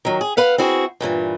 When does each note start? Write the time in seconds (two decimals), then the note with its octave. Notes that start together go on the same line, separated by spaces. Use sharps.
0.05 D#3 F#3
0.21 G#4
0.37 B4 F5 F#5
0.58 C4 E4 F#4 G#4
1.00 G2 A#2 D3 E3